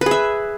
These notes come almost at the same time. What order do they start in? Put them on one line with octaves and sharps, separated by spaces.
B4 G#4 E5